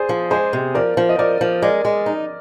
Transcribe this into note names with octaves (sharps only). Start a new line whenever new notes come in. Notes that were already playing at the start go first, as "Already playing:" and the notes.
Already playing: G#4 C5 D5
F3
G#3 G#4 C5
C3
F3 A#4 D5
F3
D#5
F3 A#4 D5
F3
G#3 A#4 D5
G#3
D#4